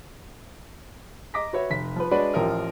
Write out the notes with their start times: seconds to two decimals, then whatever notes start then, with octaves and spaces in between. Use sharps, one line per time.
1.34 D#5 A#5 D6 A#6 B6
1.53 F#4 B4 C#5 E5
1.70 F1 B6
1.96 F3 B4
2.11 G#3 D4 F#4 B4 C#5 D5
2.34 A1 F3 G4 A#4 E5 F6